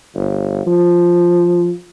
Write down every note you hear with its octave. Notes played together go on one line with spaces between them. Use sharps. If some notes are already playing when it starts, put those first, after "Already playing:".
G1
F3